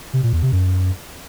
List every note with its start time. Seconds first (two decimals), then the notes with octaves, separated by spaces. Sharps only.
0.13 C3
0.23 A#2
0.33 E2
0.43 C3
0.52 F#2